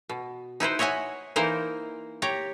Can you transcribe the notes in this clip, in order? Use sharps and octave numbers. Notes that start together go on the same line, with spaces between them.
B2
D#4 E4 B4 C5
C#5 D#5 E5 F#5 G#5
E3 A#3 D#4 A#4 C5
G4 C#5 A#5